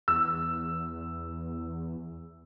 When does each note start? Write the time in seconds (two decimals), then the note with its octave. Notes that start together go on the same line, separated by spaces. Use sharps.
0.08 E2 E6